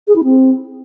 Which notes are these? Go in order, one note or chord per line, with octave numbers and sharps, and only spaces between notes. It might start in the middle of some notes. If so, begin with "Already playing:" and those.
G#4
E4
C4